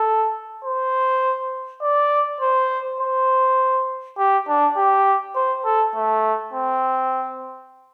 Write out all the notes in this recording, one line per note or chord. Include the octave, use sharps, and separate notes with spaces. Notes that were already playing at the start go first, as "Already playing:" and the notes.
Already playing: A4
C5
D5
C5
C5
G4
D4
G4
C5
A4
A3
C4